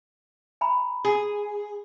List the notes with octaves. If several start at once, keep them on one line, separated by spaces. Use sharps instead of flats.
G#5 A#5 B5
G#4